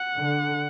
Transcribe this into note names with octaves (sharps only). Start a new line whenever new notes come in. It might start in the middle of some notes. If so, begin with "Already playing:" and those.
Already playing: F#5
D3